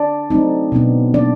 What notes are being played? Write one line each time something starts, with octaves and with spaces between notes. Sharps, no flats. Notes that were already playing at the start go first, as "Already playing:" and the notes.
Already playing: D4 D5
F#3 A3 C4 D#4
B2 F#3 B3 D4
F#3 A#3 D4 D5